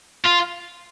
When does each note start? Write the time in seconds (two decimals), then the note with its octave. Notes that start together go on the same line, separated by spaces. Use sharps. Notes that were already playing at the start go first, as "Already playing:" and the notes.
0.26 F4